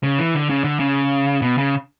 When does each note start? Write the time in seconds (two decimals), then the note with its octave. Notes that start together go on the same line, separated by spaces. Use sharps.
0.03 C#3
0.18 E3
0.34 D3
0.50 C#3
0.64 D3
0.80 C#3
1.42 B2
1.58 C#3